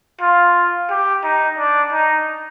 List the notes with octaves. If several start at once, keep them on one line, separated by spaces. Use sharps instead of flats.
F4
G4
D#4
D4
D#4